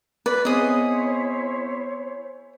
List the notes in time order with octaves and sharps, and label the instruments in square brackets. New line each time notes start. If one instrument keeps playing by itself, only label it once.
[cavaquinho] B4 D5
[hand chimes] B3 C4 [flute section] E4 C5 C#5 [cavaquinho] G#4 D#5